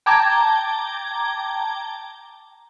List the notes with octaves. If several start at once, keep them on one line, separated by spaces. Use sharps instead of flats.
G5 A5 A#5 D6 G#6